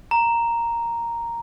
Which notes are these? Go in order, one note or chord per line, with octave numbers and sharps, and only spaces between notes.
A#5